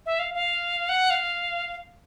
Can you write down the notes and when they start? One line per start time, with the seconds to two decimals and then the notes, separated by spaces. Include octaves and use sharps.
0.06 E5
0.19 F5
0.34 F5
0.89 F#5
1.10 F5